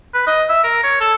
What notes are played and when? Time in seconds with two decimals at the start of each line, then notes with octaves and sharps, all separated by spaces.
0.14 B4
0.27 D#5
0.49 E5
0.64 A#4
0.84 C#5
1.01 A4